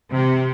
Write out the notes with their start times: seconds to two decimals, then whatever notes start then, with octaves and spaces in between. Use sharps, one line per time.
0.13 C3